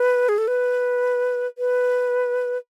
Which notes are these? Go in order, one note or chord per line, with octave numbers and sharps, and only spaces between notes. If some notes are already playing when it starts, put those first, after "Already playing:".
Already playing: B4
G#4
A4
B4
B4